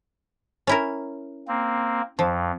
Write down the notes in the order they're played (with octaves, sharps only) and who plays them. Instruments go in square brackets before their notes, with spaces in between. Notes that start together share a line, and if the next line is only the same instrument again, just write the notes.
[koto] C#4 E4 A#4
[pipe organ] A#3 C4
[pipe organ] F2 [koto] F3